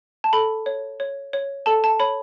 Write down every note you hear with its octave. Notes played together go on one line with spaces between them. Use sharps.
A5
A4 B5
C#5
C#5
C#5
A4 A5
A5
C#5 B5